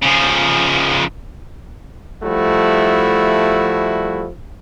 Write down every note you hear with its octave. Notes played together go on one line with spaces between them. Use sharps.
C#3 F3
F3 G3 A3 E4 F#4